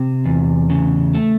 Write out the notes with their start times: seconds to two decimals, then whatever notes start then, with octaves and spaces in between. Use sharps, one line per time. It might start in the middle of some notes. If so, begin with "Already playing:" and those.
Already playing: C3
0.25 E2
0.70 C#3
1.15 A3